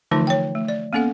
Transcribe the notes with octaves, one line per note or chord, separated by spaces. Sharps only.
D3 E3 F3 A3 D#4 F4
C#5 G5
A3
D5
A#3 B3 C#4 A4 F#5